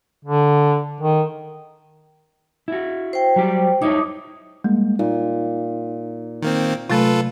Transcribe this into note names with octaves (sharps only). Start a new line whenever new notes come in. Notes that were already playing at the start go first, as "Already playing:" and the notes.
D3
D#3
E4 F#4
C5 G5
F#3 G3 G4
D#4 E4 C#5 D6 D#6
G3 G#3 A#3
A#2 D#4
D#3 A#3 C4
C3 F#3 A3 F4 A4 B4